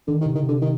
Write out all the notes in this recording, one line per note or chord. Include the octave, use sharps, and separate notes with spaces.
D3 D#3
D#3
C3
D3 D#3
C3
D3
D#3